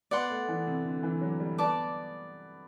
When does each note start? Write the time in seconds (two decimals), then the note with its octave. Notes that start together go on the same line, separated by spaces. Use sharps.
0.11 B3 D5 F#5 C6
0.30 A3
0.49 E3
0.67 C3
0.84 D3
1.03 E3
1.21 F#3
1.40 G3
1.58 B3 D5 A5 D6